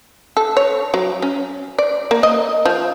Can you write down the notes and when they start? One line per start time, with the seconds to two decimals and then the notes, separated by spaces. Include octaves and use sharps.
0.37 A4
0.57 C#5
0.94 F#3
1.22 C#4
1.78 D5
2.11 A#3
2.23 D#5
2.65 F3